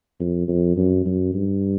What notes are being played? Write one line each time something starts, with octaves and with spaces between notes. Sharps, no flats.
F2
F2
F#2
F#2
G2